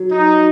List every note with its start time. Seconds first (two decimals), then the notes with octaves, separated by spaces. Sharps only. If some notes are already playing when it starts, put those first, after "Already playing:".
Already playing: F#3
0.11 D#4